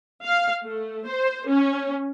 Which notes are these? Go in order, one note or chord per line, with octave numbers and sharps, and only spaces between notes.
F5
A3
C5
C#4